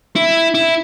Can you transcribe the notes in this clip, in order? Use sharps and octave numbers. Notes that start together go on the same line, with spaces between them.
E4
E4